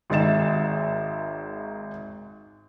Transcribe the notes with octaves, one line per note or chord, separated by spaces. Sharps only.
G#1 D#3 G#3 E5 A6 E7